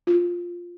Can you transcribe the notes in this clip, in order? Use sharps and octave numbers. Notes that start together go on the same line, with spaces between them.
F4